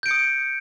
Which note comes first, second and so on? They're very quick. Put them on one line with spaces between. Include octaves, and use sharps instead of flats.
G6 D7 C#7 D#6